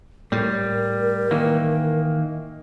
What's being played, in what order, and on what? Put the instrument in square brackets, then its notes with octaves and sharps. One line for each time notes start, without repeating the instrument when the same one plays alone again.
[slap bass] A2 [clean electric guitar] G3 [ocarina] A#4
[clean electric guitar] D#3 E3 A#3